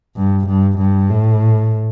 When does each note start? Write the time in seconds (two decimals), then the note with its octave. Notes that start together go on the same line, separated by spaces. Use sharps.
0.16 G2
0.47 G2
0.78 G2
1.10 A2